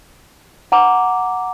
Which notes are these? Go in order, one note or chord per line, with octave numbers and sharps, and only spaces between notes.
F#5 A#5 D6